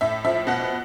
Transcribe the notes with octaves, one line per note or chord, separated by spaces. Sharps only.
A2 E5
F3 E5
B2 F#5